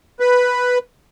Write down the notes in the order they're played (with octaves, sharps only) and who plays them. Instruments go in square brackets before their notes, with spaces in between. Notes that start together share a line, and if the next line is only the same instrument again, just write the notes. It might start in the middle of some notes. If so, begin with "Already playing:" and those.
[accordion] B4